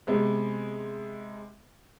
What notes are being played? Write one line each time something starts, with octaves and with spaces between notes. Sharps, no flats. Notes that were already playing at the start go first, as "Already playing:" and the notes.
C3 G#3 B3